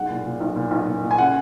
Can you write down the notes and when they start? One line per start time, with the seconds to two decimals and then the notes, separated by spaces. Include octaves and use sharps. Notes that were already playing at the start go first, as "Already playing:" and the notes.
Already playing: B1 G#3 F#5
0.10 A#2
0.26 A#2
0.40 B1
0.56 A#2
0.71 B1
0.87 A#2
1.03 A#2
1.11 G#5
1.18 C#3 F#5